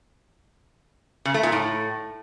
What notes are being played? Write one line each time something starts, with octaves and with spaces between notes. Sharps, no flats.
C#3
A3
A#2
A2